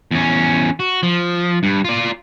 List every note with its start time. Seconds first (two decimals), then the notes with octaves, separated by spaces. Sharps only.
0.11 E2 C#4
0.80 F#4
1.03 F3
1.63 G2
1.85 F4 D5